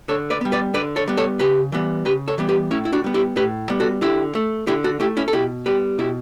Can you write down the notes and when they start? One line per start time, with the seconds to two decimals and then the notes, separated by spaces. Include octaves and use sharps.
0.08 D3 A4 C#5
0.30 B4 D5
0.41 G3 B3
0.52 B4 D5
0.74 D3 B4 D5
0.96 A4 C#5
1.08 G3 B3
1.17 A4 C#5
1.39 C#3 G4 B4
1.72 E3 G3 B3
2.05 C#3 G4 B4
2.28 A4 C#5
2.38 E3 G3 B3
2.49 G4 B4
2.71 A2 C#4 E4
2.85 E4
2.93 D4 F#4
3.04 G3 B3
3.14 E4 G4
3.36 A2 G4 B4
3.69 G3 B3
3.80 F#4 A4
4.01 D3 E4 G4
4.35 A3
4.67 D3 E4 G4
4.84 F#4 A4
5.00 A3 E4 G4
5.17 C#4 E4
5.28 A4
5.32 B2 E4 G4
5.66 G3 B3 G4 B4
5.99 B2 E4 G4